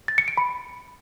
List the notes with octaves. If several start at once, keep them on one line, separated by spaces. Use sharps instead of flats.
A6
C#7
D7
B5